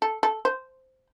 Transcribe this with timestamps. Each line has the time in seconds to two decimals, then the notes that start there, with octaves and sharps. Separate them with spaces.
0.02 A4
0.23 A4
0.45 C5